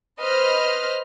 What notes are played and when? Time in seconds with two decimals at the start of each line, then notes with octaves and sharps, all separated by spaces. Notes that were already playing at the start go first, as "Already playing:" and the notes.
0.21 B4 C5 D#5 F6